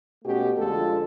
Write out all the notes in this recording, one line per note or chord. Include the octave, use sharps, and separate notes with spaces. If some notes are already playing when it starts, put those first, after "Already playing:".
B2 A3 C#4 F#4 G4
F2 D3 G#3 F4 A4